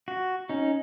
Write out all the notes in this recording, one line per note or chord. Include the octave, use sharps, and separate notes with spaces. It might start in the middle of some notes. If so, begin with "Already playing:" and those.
F#4
C#4 D#4